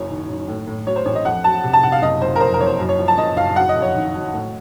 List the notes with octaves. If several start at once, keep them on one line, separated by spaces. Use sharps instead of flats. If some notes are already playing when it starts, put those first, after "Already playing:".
Already playing: F#1 F#2 C#5
D#3
D#3
A2
A2
F#3 C#5
C5
A1 C#5
D#5
F2 F#5
F#3 A5
C3
A5
C3 F#5
F5
F#1 D#5
F#1 C5
A#4
F2 C5
A#4
F#1 C#5
C5
F#2
C#5
F3
A5
F#1 D#5
F#1 F5
F#3 F#5
D#5
F2
C#5
D#3
F#3
A2